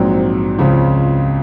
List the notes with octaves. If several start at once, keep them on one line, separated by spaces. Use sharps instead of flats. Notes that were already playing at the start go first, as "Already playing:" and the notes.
Already playing: A#1 G#2 F#3 C4
C#2 C#3 F3 C4 F4